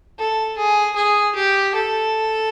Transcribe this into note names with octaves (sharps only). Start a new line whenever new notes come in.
A4
G#4
G#4
G4
A4